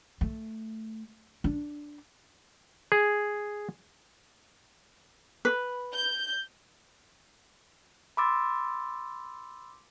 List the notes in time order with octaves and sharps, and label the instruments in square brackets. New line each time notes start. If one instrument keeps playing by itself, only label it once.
[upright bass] A3
D4
[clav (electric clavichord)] G#4
[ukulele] B4
[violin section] G6
[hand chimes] B5 C6 D6 E6 A6